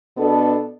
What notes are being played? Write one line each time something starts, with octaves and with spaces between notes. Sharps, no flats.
B2 B3 D4 A4